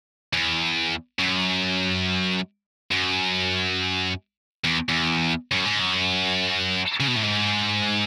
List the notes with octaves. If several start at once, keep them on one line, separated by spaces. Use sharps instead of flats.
E2
F#2
F#2
E2
E2
F#2
G#2
F#2
C#3
B2
A2
G#2